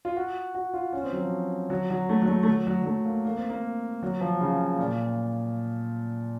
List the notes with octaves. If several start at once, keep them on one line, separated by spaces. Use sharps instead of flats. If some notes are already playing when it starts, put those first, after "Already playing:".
F4
F#4
F#4
F4
C#4
C4
F#3
F3
F#3
F#3
A3
F#3
A3
A3
F#3
F#3
F#3
A3
A#3
A#3
C4
A#3
F#3
F3
C#3
A#2